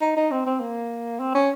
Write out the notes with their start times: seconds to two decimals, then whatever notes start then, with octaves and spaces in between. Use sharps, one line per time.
0.01 D#4
0.16 D#4
0.31 C4
0.46 C4
0.60 A#3
1.19 C4
1.35 C#4